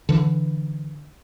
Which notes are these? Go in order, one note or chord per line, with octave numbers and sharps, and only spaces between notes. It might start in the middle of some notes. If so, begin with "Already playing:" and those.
D3 E3